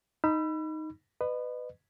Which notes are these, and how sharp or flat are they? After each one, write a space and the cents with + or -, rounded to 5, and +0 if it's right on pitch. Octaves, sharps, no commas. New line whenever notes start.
D#4 +0 B5 +0 E6 +40
B4 +15 D#5 -30